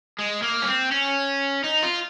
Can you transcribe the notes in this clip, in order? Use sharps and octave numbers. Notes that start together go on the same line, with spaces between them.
G#3
A#3
C#4
C4
C#4
D#4
F4